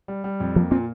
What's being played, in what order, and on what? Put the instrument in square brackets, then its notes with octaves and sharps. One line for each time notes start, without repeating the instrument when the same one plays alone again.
[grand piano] G3
G3
F2
[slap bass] F3 [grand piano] A#3
[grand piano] A#2 [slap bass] C4